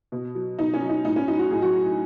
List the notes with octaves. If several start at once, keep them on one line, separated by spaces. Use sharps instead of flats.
B2
F#3
B2 D#4
C#4
F#3
D#4
A2 D#4
C#4
F#3 D#4
F#4
A2 G#4
F#3 F#4
F#3